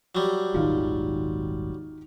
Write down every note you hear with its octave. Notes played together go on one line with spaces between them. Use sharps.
F#3 G3
D#1 G#1 D#3 F4